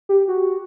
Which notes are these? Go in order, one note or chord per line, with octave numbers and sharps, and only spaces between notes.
G4
F#4